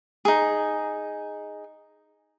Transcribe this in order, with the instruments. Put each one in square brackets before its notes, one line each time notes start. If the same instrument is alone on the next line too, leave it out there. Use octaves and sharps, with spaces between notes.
[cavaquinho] D#4 G#4